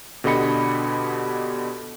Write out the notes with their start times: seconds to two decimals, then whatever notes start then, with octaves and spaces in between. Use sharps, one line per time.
0.24 B2 D3 G4 D#5 B5 C#7